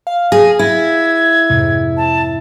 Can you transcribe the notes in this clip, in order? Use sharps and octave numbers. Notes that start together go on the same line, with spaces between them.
F5
G#4 A#6
E4 G#6
F2 G#2 C3
A5